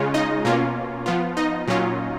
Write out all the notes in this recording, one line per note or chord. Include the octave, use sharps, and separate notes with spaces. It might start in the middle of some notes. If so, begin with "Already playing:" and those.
Already playing: C#3 G#3 C#4 F4
D#4 D#5
B2 A#3 C#4 F4
F3 B3 F4
D#4 D#5
A#2 F#3 C#4 F4